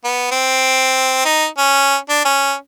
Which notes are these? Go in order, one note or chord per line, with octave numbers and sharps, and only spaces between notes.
B3
C4
D#4
C#4
D4
C#4